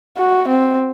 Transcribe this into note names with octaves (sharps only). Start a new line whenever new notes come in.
F#4
C4